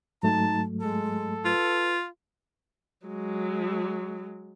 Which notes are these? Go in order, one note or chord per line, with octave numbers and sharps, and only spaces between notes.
G#2 F#3 A3 D#4 A5
G#3 A4
F4 B4
F#3 G#3